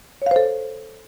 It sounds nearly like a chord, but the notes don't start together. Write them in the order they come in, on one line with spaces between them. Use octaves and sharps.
C#5 F5 C5 A4